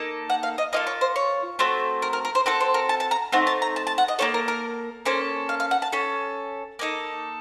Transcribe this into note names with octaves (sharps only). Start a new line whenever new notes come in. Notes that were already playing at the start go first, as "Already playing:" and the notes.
Already playing: A#3 D#4 A4
F#5
F5
D#5
A#3 F4 A4 D#5
C#5
C5
C#5
A3 C4 F#4 A4
A#4
A#4
A#4
C5
C4 F#4 A4 A#4
C5
A#4
A5
A5
A#5
A3 C4 D#4 F#5
A5
A#5
A5
A5
F#5
D#5
A#3 C#4 A4 C#5
A#4
A#4
A#3 C#4 A4 C5
F5
F5
F#5
A5
C#4 A4
A#3 D#4 A4